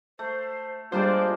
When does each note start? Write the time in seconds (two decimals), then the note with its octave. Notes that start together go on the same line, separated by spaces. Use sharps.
0.19 A3 C5
0.92 G3 G#3 A#3 D4 F4 C5 D5